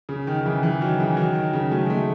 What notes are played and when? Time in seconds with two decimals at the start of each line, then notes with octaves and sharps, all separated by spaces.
0.09 C#3
0.27 D#3
0.41 D#3
0.46 C#3 E3
0.63 C#3 E3
0.81 D#3 F#3
1.00 C#3 E3
1.17 D#3 F#3
1.35 D#3
1.53 C#3
1.71 F#3 A3
1.86 G#3
1.89 F#3 A3